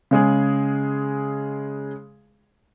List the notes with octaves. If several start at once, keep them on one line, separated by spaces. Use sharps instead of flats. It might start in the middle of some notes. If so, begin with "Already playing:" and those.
C#3 G#3 G#4